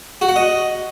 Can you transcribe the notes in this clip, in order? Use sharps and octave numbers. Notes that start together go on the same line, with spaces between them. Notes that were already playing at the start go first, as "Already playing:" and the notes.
F#4
F#5
D#5